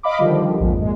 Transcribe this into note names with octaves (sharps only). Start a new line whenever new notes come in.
D#5 F5 B5 D6
D3 D#3 F3 G3
A#1 F2 G#2
A#2 G#3